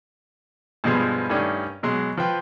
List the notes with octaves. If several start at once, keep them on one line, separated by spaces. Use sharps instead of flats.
G2 B2 F3 G#3 B3
G2 D#3 A3 C#4 D4
B2 F#3 G#3
F3 B4 G5 C6